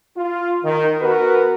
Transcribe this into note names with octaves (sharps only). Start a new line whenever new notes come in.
F4
D#3
B3 F#4 A#4 B4